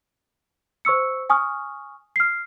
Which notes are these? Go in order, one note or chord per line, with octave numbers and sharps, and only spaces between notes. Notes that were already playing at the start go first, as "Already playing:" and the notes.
C5 C#6 E6 C#7
G#5 C#6 D#6 F6
F6 C7